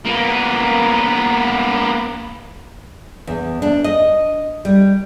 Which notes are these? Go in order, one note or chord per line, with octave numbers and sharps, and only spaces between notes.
A#3 B3
E2
D4
D#5
G3